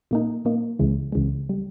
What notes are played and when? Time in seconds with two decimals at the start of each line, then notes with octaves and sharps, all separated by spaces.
0.11 A#2 A#3 D#4
0.45 A#2 A#3 D#4
0.79 C#2 C#3 E3 G#3
1.12 C#2 C#3 E3 G#3
1.49 G3